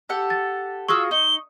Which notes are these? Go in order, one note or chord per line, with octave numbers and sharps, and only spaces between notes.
G4 A4 F#5
A6
F4 F#4 G#4 C#6 D#6 E6
D#4 G7